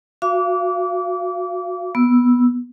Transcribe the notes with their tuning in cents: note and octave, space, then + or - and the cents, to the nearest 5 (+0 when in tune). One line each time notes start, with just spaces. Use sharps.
F#4 -25 F5 -35 D6 -30
B3 -10 E6 +0